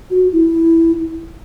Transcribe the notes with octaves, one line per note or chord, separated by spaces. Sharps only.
F#4
E4